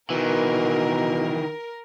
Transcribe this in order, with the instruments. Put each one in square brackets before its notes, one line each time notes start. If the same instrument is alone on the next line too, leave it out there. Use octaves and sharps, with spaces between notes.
[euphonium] B2 [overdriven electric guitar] D#3 E3 [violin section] A#4